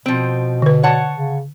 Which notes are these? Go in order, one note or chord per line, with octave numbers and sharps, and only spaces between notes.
B2 F3 C4
D3 B4
C#5 F#5 A5
C#3